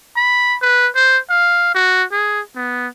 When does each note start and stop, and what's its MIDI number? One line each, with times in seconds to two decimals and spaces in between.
0.16 0.56 83
0.62 0.88 71
0.95 1.18 72
1.30 1.73 77
1.75 2.03 66
2.12 2.40 68
2.56 2.88 59